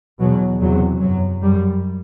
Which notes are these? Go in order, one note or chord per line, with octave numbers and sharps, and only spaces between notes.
E2 B2 F#3
E2 C3 F#3
F#2 F#3
F#2 G3